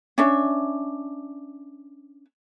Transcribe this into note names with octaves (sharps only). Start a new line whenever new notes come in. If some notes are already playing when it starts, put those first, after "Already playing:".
C#4 D4 E5